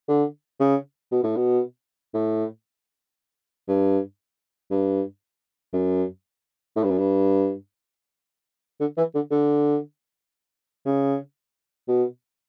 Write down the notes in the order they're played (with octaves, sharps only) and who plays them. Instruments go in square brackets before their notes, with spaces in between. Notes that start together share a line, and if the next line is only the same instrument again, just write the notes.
[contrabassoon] D3
C#3
B2
A2
B2
A2
G2
G2
F#2
A2
G2
F#2
G2
D3
E3
D3
D3
C#3
B2